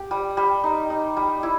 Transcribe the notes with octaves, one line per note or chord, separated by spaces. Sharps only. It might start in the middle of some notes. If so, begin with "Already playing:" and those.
Already playing: G4
G3
G3
D#4
D#4
G3
E4